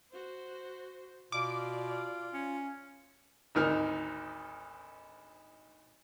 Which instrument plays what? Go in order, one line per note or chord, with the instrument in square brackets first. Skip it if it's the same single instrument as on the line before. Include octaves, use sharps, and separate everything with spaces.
[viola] F#4 C5
[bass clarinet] B2 [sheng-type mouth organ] F4 [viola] D5 [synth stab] D6
[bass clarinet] C#4
[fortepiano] G#1 D2 D#4 A#4 F6